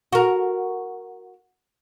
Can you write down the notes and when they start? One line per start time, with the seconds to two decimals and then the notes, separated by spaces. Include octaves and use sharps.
0.13 F#4 A#4